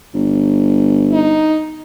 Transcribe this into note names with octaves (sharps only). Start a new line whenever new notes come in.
G1
D#4